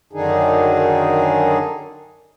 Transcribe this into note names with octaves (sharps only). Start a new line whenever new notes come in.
F#2 D3 D#3 D4 D#4 G#4